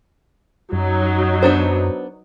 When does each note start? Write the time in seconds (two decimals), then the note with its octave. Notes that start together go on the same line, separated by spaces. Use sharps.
0.73 F#2 F#3 D#4
1.42 B3 D4 C5